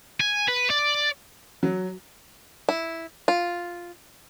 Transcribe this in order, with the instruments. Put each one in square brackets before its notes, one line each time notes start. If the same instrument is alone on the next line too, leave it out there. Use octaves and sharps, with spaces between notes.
[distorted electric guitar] G#5
B4
D5
[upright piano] F#3
[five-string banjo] E4
F4